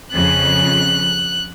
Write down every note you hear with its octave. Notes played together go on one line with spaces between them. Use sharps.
F2 C#3 F#6